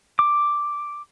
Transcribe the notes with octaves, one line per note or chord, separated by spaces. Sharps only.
D6